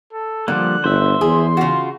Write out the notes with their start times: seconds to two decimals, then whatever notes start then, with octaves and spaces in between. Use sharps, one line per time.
0.13 A4
0.48 D3 F3 G3 A#3 F#6
0.84 G1 C5 E5
1.21 E2 G#4 C6
1.57 C#3 F4 F#4